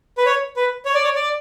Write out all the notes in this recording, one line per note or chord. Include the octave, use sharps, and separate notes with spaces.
B4
C#5
B4
C#5
D5
C#5
D5